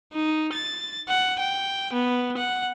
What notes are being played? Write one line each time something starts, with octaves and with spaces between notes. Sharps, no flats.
D#4
A6
F#5
G5
B3
F#5